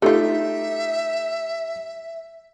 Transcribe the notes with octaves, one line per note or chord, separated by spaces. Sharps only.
A3 D#4 F4 G4 A4 E5